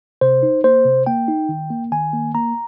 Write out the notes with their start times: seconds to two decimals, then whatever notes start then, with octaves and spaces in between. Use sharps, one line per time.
0.21 C3 C5
0.43 D#4
0.64 A#3 C5
0.85 C3
1.06 A#3 G5
1.28 D#4
1.49 D#3
1.70 A#3
1.92 D#3 G#5
2.13 A#3
2.35 A#3 A#5